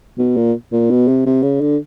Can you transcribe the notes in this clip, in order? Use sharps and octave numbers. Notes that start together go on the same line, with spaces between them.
B2
A#2
A#2
B2
C3
C3
C#3
D3